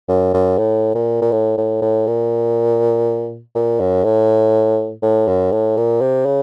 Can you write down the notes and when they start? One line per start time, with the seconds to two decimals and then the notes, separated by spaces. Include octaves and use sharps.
0.09 F#2
0.34 F#2
0.58 A2
0.95 A#2
1.22 A#2
1.32 A2
1.58 A2
1.82 A2
2.07 A#2
3.55 A#2
3.80 F#2
4.04 A2
5.02 A2
5.28 F#2
5.52 A2
5.77 A#2
6.02 C3
6.26 C#3